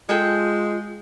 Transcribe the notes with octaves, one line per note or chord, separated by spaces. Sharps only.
G#3 F4 G#4 A4 G5